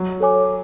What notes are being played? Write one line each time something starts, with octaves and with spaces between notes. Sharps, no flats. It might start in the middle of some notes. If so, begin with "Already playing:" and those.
Already playing: F#3
A4 C#5 G#5 D6